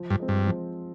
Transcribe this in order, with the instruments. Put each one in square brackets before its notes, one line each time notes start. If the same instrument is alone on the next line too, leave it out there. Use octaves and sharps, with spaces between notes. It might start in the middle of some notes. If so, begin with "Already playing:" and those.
Already playing: [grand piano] F3
[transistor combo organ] G2
[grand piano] G#3 C4
[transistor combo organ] G2
[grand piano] F3